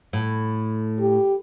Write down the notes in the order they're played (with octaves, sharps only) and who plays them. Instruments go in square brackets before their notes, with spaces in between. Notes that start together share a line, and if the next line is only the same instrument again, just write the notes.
[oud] A2
[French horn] G4